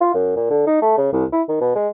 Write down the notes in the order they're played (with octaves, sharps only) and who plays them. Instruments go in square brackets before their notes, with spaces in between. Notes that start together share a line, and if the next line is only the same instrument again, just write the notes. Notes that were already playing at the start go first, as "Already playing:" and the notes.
[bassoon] F4
F#2
A#2
D3
D#4
A3
C#3
C2
E4
D#3
B2
G#3